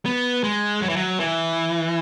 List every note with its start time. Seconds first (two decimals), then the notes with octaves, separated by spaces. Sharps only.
0.06 B3
0.44 G#3
0.82 F#3
0.89 E3
0.96 F#3
1.20 E3